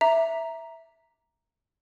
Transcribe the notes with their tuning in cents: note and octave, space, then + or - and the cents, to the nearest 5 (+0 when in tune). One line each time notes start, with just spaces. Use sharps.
E5 +0 A#5 +0 D6 +0